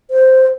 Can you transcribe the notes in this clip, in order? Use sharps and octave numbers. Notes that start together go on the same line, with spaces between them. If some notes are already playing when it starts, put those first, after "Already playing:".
C5